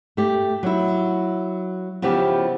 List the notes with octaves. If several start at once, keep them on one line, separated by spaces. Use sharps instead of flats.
A3 G4
F#3 E4
C#3 F3 B3 E4 G4